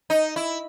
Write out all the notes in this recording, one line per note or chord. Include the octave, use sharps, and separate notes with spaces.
D#4
E4